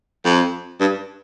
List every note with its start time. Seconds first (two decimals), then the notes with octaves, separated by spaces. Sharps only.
0.25 F2
0.81 G2